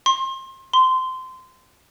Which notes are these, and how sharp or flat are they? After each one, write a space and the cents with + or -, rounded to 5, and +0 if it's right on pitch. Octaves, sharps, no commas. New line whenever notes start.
C6 +30
C6 -20